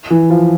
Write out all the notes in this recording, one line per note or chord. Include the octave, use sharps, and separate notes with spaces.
E3
F3